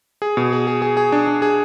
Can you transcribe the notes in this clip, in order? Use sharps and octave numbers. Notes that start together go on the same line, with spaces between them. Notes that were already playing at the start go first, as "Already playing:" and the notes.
G#4
B2
G#4
G#4
G#4
G#4
D4
D4
G#4